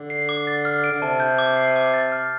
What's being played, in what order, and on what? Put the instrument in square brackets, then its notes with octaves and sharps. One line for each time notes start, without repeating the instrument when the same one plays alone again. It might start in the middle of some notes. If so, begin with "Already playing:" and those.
Already playing: [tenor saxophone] D3
[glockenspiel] C7
D6
A6
F6
D7
[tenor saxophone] D3
[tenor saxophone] C3 [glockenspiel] A5
[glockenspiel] G6
D6
C7
D6
A6
F6